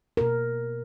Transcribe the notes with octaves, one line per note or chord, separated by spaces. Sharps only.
B2 A#4